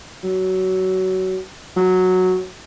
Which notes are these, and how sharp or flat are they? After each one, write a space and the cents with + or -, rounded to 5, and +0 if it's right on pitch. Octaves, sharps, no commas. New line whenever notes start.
F#3 +20
F#3 -5